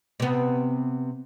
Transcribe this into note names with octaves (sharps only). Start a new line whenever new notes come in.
C3 B3